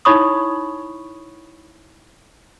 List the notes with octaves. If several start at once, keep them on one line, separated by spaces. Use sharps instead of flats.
D#4 E4 C#5 B5 C#6 D#6